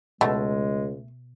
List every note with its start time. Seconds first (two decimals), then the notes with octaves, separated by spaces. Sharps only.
0.21 C#2 B2 G#3 A3